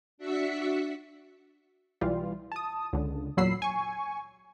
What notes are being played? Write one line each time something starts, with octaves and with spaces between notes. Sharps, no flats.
D4 F#4 E5 B6 C#7
B1 E3 G3 F4
A5 D#6
C#2 D3
E2 A#2 F#3 B5 E6 C7
G#5 C#6